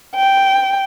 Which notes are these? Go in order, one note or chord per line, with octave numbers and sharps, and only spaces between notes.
G5